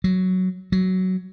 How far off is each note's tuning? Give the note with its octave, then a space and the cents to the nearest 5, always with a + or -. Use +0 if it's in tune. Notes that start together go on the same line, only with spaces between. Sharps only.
F#3 +5
F#3 +10